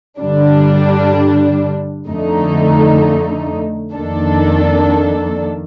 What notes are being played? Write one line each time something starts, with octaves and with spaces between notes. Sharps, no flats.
G2 D3 G3 D4
F2 D3 A3 D#4
F2 D#3 A#3 D4 A4